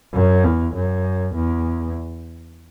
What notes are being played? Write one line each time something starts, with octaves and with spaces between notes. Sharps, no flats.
F#2
E2
F#2
E2